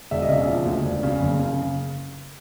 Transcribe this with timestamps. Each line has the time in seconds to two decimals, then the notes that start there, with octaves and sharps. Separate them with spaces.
0.11 E1 E5
0.22 D#5
0.29 C#3 E5
0.48 F3
0.66 D2
0.85 E1
1.03 C#3
1.20 F#1
1.39 C#3